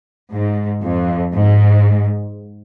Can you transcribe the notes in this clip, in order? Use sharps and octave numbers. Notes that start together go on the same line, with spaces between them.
G#2
F2
G#2